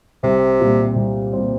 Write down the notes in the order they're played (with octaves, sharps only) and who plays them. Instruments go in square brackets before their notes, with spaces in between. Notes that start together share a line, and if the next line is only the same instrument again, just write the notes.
[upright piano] C2 [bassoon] C3
[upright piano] A#2 G3 C4
C2
A#2 G3 C4